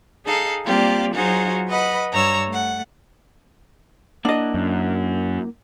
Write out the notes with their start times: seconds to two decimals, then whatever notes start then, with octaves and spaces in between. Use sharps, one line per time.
0.25 D#4 G#4 A4 F5
0.65 G3 A#3 C4 F4 G4 D5
1.14 F#3 D#4 F4 F#4 G#4 C5
1.68 B4 D#5 F#5 B5
2.12 G2 C#5 A#5 E6
2.48 A3 F#5
4.25 A#3 D4 E4 D#5 F#5
4.54 F#2